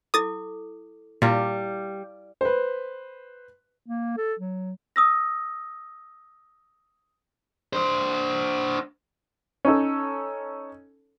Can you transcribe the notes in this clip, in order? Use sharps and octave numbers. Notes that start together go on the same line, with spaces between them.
E4 A4 D6 D#6 A6
A#2 G3 E4 F5
B4 C5
A#3
A4
F#3
D#6 E6 A#6
D4 C5
C#4 D#4 A4